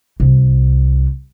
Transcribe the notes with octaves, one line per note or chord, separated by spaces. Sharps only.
C2